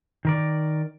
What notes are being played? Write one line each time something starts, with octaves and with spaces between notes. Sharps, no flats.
D#3 A#4 D5